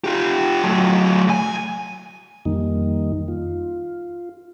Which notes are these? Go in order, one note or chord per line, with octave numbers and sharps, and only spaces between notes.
F4 G4
F#3 A3
C2 G#5
F2 D#3 G3 A#3 D#4
F4